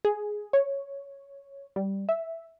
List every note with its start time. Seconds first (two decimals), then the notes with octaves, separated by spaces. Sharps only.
0.05 G#4
0.53 C#5
1.76 G3
2.09 E5